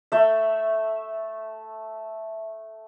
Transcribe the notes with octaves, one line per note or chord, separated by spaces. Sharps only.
A3 E5